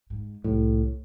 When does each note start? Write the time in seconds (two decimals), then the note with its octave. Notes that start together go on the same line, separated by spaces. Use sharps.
0.10 G#2
0.44 C2 A2